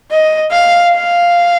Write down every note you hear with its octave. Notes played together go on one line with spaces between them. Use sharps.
D#5
F5
F5